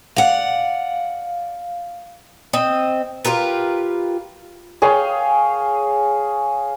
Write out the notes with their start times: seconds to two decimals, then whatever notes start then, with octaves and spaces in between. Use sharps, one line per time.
0.17 D5 F5 F#5
2.53 C4 D#5
3.25 F4 G4 A#4 B4
4.82 G#4 C#5 F5 G5